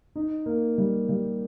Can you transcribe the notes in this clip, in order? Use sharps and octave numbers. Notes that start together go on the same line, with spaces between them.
D#4
A#3
G3
G3